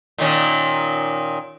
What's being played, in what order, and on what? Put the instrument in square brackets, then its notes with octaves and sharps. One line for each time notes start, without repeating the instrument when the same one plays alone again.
[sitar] A#2 D#3 C#4